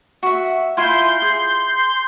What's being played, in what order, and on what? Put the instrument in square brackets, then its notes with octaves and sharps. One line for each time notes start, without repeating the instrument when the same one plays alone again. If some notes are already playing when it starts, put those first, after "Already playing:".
[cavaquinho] F#4 E5
[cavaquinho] E4 F4 G#5 [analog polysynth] C6 G6
[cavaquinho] G#4